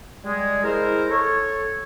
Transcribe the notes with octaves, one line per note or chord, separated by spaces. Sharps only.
G3 G#3
G#3 E4 A#4 C5
A4 C#5